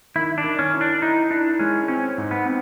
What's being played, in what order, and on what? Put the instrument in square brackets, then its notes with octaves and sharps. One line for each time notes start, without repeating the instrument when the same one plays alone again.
[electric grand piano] D#3 [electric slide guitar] E4
[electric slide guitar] D4
[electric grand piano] D#3
[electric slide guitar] C#4
[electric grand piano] E4
[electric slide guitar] D4
[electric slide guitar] D#4 [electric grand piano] E4
[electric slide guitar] D4 [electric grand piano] E4
[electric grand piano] G#3 [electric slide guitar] C#4
[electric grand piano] C4 [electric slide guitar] C#4
[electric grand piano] G#2
[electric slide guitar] B3
[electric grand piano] C4